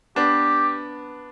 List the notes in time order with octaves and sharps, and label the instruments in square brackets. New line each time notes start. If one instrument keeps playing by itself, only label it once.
[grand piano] B3 D4 [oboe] G4